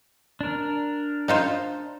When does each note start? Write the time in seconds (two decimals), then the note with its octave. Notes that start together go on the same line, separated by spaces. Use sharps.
0.41 D4 A#4
1.28 D#4 F4 C5